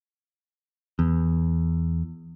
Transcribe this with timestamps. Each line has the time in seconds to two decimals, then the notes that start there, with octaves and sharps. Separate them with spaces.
0.99 E2